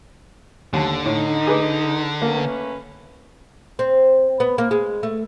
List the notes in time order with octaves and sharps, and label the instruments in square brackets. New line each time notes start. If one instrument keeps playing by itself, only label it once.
[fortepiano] D#2 A5 [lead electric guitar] D3
[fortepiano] A2 [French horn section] D#4
[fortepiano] G#4 B4 D6
[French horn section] A3 C#4 B4 [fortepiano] A#3
[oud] C4
B3
A#3
G#3
A3